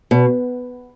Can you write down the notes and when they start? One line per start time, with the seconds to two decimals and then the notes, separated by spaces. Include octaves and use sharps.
0.11 B2